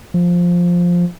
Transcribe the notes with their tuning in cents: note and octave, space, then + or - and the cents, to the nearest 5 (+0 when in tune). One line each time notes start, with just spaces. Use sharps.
F3 +5